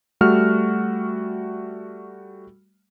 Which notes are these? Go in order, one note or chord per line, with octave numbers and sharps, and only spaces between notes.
G3 A3 F#4 F6